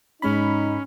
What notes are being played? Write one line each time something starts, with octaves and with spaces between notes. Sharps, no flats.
G#2 G#3 C#4 D#4 B5